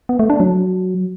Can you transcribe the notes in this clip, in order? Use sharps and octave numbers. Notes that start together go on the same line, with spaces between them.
B3
A3
D4
F#3